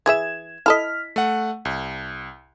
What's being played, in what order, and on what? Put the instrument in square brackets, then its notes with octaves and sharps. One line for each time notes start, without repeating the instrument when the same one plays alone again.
[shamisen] E3 G#4 E5 [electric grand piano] G#6 E7
[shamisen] E4 A4 D#5 [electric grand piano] F6 B6
[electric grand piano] A3 F#5
C2